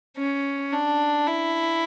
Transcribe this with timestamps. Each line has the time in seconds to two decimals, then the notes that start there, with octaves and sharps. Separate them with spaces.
0.18 C#4
0.72 D4
1.27 E4